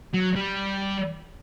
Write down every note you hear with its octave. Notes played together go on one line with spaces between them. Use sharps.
F#3
G3